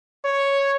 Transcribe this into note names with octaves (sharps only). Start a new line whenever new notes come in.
C#5